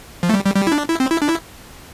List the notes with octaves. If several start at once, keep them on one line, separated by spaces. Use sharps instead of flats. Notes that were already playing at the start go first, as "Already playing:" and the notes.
F3
A3
G3
G3
G3
E4
D4
E4
C4
E4
D4
E4